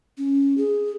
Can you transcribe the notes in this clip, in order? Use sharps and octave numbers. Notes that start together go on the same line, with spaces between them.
C#4
G#4